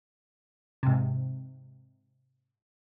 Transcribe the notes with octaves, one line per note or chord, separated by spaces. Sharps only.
G#2 C3